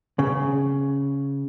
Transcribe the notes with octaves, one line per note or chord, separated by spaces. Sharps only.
C#3